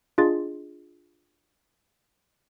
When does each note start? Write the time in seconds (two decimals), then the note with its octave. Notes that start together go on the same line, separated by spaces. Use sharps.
0.18 D4 F4 G#4 D#5 C6 A6